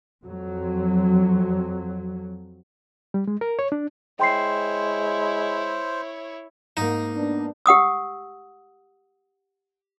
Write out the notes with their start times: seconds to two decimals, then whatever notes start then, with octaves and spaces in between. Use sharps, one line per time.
0.24 F2 F#3
3.14 G3
3.28 G#3
3.41 A#4
3.59 C#5
3.72 D4
4.20 G#3 E4 C5 C#5 G5 C6 C7
6.77 G#2 A#3 D#4
7.17 B3 D4
7.66 G4 F#5 D#6 E6